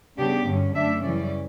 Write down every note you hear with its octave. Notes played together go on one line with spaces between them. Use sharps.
C#3 G3 B3 D4 G4
G2 D3 F#3 C#4
F#2 D3 A3 D4 E5
F#2 C#3 E3 G3 C#4 D5